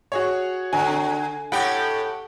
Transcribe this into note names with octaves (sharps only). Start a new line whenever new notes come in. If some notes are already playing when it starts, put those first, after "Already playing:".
F#4 G#4 C#5
D3 G#5
A2 G4 F#5 G5 B5